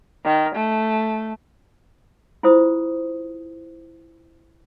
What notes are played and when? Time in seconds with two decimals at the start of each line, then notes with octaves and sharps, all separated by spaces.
0.25 D#3
0.55 A3
2.43 E4 F4 C5 D#6